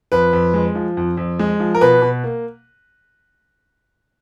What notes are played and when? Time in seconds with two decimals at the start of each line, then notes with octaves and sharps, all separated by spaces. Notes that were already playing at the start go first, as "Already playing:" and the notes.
0.12 F2 B4
0.33 F2
0.54 G#3
0.75 F3
0.97 F2
1.17 F2
1.39 G#3
1.60 F3
1.75 A#4
1.81 B2 B4
2.02 B2
2.24 A#3